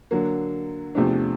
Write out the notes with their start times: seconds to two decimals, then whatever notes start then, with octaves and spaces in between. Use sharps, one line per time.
0.11 D3 F#3 A#3
0.95 E2 C3 F3 A3 D4